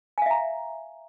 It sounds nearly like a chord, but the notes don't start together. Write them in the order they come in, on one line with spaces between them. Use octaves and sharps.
G#5 F5 E5 A#5